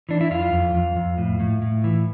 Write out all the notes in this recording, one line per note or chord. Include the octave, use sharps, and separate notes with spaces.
E3 D4
E4
F2 F4
F2
F2
F2
A2
A2
A2
E3